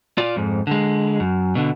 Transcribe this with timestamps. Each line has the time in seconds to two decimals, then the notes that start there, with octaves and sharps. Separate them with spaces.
0.18 F4 D5
0.36 F2 G#2
0.67 D3 G#3
1.20 F#2
1.55 B2 D3